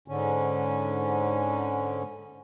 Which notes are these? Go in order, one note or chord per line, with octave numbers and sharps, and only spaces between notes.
G#2 D3 C#4